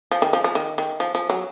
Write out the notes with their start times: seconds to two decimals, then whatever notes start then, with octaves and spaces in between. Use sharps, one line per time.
0.11 F3
0.22 D#3
0.33 F3
0.44 F3
0.55 D#3
0.78 D#3
1.00 F3
1.15 F3
1.30 F#3